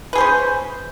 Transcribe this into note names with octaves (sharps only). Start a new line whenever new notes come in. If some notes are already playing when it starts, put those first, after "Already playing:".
C#4 G#4 B4 C5